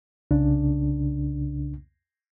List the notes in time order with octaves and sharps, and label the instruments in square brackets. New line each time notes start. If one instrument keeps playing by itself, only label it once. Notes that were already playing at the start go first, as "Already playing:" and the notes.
[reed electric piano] C2 C#3 D4